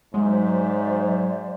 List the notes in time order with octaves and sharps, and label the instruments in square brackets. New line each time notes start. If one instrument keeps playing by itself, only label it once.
[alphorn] G#2 [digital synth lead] F#3 [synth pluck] G#3 [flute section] C5 D5 E5